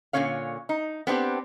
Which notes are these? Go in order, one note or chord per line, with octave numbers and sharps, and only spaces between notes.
A#2 D3 G#3 C#4 C#5 F5
D#4
B3 C4 D4 G4